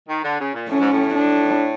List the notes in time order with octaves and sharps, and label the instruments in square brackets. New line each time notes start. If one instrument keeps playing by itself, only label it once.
[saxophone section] D#3
D3
C#3
A#2
[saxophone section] A2 [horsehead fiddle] C#4
[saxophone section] G#2
A2
[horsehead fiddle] D4